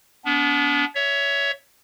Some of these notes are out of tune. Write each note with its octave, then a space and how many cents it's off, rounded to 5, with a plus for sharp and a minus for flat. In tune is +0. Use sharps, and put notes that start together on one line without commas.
B3 +0 D4 -40
C#5 +20 E5 +0